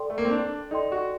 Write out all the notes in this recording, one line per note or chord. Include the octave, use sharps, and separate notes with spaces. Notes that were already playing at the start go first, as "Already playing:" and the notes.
Already playing: A4 D5 G5 C6
A3
A#3
C4
D4
D#4 A4 D5 G5 C6
F#4